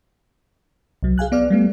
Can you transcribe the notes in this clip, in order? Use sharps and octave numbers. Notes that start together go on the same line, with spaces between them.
C2 F#3
G#4 F5 G#5 F#6
B3 D5 F6
G3 A3 B3